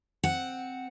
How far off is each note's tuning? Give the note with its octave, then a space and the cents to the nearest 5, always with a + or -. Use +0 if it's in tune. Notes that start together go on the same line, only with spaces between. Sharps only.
C4 +0 F#5 +0